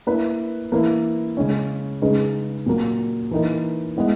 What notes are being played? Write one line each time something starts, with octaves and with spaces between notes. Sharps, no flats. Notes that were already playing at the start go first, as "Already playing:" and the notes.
A#3 E4 B4
E3 A#3 E4 B4
C#3 G#3 C#4
C#3 G#3 D#4 G#4 B4
A#2 F#3 A#3
E3 A#3 D#4 A#4
G#3 B3 E4